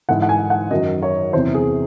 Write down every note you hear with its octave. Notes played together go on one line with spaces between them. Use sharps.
G#2 E3 F#5
F#5
G#5
F#5
F#2 D#3 F#3 D#5
C#5
E2 C3 E3 C5
G#4